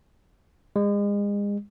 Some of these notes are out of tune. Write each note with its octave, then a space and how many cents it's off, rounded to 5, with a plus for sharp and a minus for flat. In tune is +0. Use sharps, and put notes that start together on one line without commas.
G#3 -35